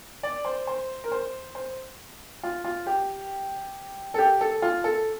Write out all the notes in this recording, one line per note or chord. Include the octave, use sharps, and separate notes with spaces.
D5
C5
C5
A#4
C5
C5
F4
F4
G4
A4
G4
A4
F4
A4